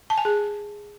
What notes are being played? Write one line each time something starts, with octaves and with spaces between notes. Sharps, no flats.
A5
G#5
G#4